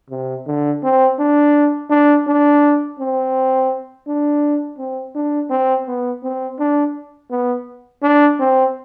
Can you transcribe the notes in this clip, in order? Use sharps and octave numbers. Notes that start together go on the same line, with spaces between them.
C3
D3
C4
D4
D4
D4
C4
D4
C4
D4
C4
B3
C4
D4
B3
D4
C4